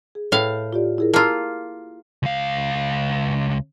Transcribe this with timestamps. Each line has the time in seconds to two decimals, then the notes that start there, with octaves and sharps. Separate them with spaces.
0.15 G#4
0.32 A2 B4 F5
0.73 F4 G4 D5
0.98 E4 G#4 A#4
1.14 A#3 F4 A5 C6 E6
2.23 C#2 F5